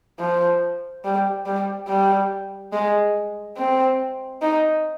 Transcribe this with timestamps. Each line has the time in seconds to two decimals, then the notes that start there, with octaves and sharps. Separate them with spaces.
0.20 F3
1.04 G3
1.46 G3
1.88 G3
2.73 G#3
3.58 C4
4.42 D#4